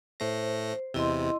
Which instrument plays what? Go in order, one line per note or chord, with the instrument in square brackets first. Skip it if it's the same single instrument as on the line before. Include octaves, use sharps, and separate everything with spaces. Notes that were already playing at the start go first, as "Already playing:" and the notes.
[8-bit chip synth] A2 A3 A#6 [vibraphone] C5
[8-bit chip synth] E2 C3 [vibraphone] E4 D#5 C6